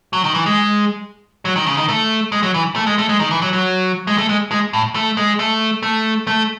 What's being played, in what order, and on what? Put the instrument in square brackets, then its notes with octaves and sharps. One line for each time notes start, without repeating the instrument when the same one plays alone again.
[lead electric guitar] F#3
D#3
E3
G#3
F#3
D#3
C#3
D#3
A3
G#3
F#3
E3
A3
G#3
A3
G#3
D#3
E3
F#3
F#3
G#3
A3
G#3
G#3
A2
A3
G#3
A3
A3
A3